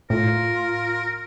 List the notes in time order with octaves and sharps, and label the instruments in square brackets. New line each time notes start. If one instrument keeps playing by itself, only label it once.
[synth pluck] A2 [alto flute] F4 [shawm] A#4